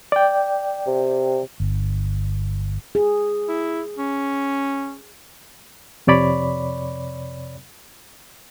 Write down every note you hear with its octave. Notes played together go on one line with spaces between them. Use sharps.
D5 G5
C3
G1
G#4
E4
C#4
F2 C3 C#5 D5 B5